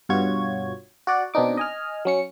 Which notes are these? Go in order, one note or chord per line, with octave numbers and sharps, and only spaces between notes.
G2 B2 F4 F#4 C#5 G#6
F#4 D5 F#5
B2 C4 D4 D#4 D6
D#5 G#5 F6
F#3 C#4 C#7